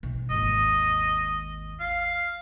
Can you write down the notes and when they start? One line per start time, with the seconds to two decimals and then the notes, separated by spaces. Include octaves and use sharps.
0.03 B1
0.30 G#1 D#2 D#5
1.80 F5